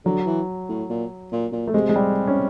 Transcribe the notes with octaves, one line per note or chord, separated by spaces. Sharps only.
D3 F#3
E3
A2
A#2
A#2
A#2
A3
C3 G#3
G#3
G3
C#4